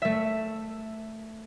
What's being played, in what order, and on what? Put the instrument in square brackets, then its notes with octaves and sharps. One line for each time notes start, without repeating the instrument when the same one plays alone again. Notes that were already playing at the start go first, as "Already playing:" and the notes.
[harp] A3 E5